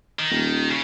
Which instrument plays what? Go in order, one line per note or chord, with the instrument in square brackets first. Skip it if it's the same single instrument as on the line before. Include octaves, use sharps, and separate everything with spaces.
[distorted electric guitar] D#3
[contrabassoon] D#1
[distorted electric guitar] C#3